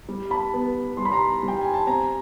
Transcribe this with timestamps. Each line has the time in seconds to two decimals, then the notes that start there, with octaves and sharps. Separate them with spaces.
0.09 G3
0.31 A5 B5
0.53 B3
0.97 G3 C6
1.05 B5
1.12 A#5 C6
1.43 G3
1.48 G5
1.61 G#5
1.74 A5
1.87 C4 G#5 A#5